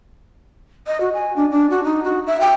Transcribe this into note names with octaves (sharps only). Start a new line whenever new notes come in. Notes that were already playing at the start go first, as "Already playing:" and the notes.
D#5
F#4
G#5
D4
D4
F#4
D#4
F#4
E5
G5